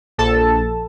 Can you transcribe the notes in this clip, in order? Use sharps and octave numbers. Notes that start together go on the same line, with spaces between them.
A#1 A4 A5